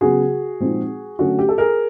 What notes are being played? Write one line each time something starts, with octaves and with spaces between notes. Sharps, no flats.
C#3 F#3 B3 F#4 G#4
A#2 F3 G#3 C4 D#4
D3 F#3 A3 C#4 F#4
G4
A4
G#4 A#4